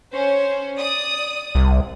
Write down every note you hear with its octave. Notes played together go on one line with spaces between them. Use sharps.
C#4 C5
D5 D#6
C2